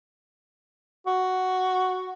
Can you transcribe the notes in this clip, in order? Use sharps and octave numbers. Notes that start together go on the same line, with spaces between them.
F#4